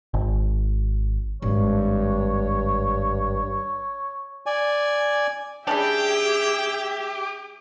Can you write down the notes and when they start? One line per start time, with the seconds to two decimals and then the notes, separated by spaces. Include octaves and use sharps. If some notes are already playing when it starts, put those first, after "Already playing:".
0.14 G#1
1.42 G#1 G2 C#5
4.46 D5 G#5
5.67 G3 C#4 D4 G4 G#4 E5 G5